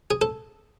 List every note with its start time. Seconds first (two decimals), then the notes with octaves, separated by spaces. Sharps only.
0.11 G#4
0.21 A4